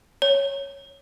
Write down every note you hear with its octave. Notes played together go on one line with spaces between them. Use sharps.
C#5